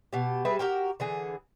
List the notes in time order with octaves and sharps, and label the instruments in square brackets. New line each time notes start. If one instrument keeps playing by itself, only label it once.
[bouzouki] B2 G4
G3 G#4 B4 E5
F#4 G4 A#4 G5
D3 E3 G#4